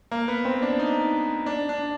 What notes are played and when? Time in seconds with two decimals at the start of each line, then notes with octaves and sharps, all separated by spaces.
0.11 A#3
0.28 B3
0.45 C4
0.62 D4
0.79 D#4
1.46 D4
1.69 D4